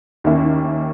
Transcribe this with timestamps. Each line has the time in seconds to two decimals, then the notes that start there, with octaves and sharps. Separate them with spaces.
0.24 D#2 D#3 A#3 C#4 E4